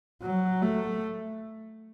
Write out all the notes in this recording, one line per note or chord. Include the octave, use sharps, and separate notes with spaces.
F#3
A3